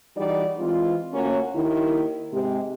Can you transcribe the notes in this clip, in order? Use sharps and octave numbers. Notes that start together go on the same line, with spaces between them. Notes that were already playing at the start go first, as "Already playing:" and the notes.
E3 G3 D#4 F#4 G#4 D5
E3 G#3 C4 F4
D2 A#3 C#4 F#4 C#5
D#2 D#3 E4
G#2 C3 G#3 C4 G4